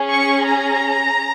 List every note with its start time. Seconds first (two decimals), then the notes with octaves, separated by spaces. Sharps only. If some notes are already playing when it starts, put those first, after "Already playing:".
Already playing: C#4 G#4
0.10 C#6
0.46 A#5